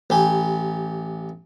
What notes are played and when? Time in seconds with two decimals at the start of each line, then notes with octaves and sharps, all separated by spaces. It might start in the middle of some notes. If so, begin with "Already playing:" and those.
0.10 A1 G4 G#5